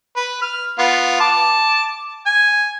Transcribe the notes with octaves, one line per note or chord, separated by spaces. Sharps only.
B4
F6
B3 F4
A5 D6
G#5